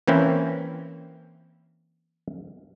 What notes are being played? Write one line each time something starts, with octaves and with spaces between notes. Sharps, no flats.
E3 A#3 C4 C#4 E4